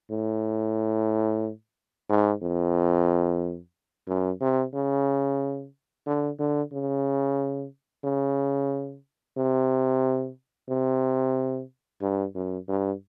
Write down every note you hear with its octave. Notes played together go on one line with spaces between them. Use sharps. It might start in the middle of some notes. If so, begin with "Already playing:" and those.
A2
G#2
F2
F#2
C3
C#3
D3
D3
C#3
C#3
C3
C3
G2
F#2
G2